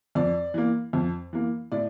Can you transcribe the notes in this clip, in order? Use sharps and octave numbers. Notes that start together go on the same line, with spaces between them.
F2 D5
E3 A#3
F2
E3 A#3
A2 D5